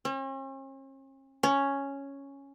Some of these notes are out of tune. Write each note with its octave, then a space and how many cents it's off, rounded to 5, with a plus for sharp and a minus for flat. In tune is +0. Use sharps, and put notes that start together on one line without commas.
C#4 -45
C#4 +0